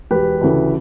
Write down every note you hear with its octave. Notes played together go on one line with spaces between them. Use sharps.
E1 G4 B4
D2 C#3 E3 A3